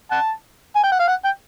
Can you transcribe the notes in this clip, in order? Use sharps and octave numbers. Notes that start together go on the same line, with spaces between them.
F#5 A5
G#5
G5
F#5
F5
F#5
G5